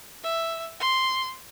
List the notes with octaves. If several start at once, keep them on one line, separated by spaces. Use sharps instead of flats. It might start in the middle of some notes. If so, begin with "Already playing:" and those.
E5
C6